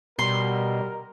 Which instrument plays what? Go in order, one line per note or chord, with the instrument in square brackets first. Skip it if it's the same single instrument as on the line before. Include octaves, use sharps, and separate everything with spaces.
[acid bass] B2 [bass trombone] G3 [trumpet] A#4 [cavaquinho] C6